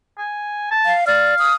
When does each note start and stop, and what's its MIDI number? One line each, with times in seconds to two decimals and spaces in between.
0.18 0.67 80
0.71 0.94 81
0.85 1.05 77
1.07 1.35 74
1.07 1.54 77
1.39 1.54 87